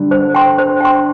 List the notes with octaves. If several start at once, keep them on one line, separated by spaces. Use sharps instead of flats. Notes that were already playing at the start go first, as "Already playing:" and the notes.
Already playing: D3 G3
C5
G5 C6
C5
G5 C6